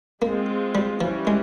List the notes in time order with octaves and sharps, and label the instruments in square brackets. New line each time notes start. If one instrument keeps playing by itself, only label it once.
[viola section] G#3 C4 F4 [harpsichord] A#3
[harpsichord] G3
[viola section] E3 G3 C#4 [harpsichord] F3
[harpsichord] G#3